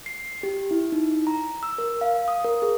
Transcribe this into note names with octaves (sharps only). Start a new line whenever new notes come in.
C7
G4
E4
D#4
A#5
E6
A#4
F5
D#6
A#4
G#4